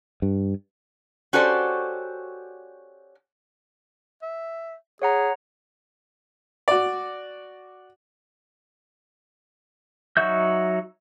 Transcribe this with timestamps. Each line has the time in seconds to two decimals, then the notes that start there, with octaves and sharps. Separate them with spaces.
0.22 G2
1.33 C#4 F#4 G4 A4 C5 D5
4.22 E5
5.02 G#4 C#5 F#5 A#5
6.68 F#4 D5
10.17 F#3 D#4 F#4 E5 G6